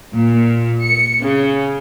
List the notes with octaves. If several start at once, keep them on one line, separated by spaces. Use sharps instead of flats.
A#2
C#7
C#3